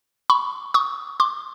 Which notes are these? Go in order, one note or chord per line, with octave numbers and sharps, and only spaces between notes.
B5 C#6
C#6 D#6
C6 D6